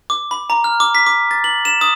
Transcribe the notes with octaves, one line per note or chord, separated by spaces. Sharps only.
D6
B5
A#5
F6
D6
B6
D6
A6
F#7
E7
D#6